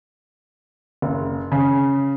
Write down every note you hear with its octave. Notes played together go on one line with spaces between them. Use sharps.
F#1
C#3